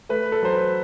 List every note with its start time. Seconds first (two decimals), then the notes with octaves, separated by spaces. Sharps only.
0.09 A3 B4
0.32 A4
0.42 F#3 C5
0.54 B4